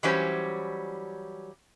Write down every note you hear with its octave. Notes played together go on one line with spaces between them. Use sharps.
E3 F#3 G3 C#4 G4 C5